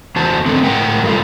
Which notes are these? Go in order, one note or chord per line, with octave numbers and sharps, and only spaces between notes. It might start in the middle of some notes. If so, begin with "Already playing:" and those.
E2 F#4 C5 A5
D3 A3 B3 C4
A2 A#4 F#5 G5
G2 G3 A3 F4